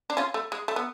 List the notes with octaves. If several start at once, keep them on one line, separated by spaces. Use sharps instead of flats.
D4
C#4 F4
A3
G#3
A3
B3